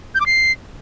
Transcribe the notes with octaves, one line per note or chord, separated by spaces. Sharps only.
G6
D6
C7